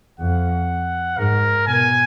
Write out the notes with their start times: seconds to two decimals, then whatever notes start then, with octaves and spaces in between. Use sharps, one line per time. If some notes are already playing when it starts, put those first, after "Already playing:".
0.19 F2 F#5
1.18 G#2 A#4
1.67 B2 G#5